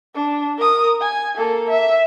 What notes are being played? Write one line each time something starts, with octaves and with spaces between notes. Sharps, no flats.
D4
A#4 D#6
G#5
A#3 A4
E5